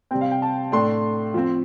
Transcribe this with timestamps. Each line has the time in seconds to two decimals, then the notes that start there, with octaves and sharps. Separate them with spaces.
0.11 C3 G3 C4 G5
0.21 F5
0.31 G5
0.42 A5
0.72 A2 A3 D4 C6
1.34 F3 C4